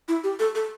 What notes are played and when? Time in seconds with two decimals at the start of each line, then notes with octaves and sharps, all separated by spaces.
0.08 E4
0.24 G4
0.39 A4
0.55 A4